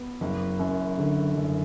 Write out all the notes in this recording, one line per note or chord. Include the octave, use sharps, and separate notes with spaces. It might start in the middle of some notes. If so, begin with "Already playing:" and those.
Already playing: B3
F#1
F#2
D3
F#1